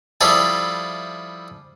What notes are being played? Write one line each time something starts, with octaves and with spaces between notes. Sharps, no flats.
F3 G3 E4 G#4 A4